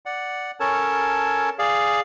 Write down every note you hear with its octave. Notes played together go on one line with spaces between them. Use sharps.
D5 F#5
C#4 A4 A#4 C#5 A5
G#4 D5 F5